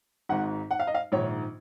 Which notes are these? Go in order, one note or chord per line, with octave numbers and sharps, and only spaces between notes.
G#1 G#2 D#3 F#5
F#5
F5
D#5
F5
A#1 G#2 D#3 C#5